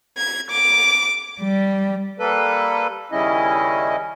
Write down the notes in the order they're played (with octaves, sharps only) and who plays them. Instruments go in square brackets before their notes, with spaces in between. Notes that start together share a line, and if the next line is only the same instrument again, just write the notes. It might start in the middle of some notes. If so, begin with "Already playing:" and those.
[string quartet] G#6
D6
G3
[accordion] G3 A#3 A4 B4
D#2 C#3 G3 C#4 E4 D#5